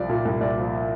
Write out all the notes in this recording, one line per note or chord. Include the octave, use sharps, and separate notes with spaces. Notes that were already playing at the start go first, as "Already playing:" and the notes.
Already playing: C2 F3 D5
A#2
C2
C2 D5
F3